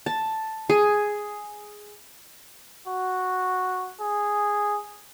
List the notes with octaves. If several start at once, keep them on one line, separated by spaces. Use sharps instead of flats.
A5
G#4
F#4
G#4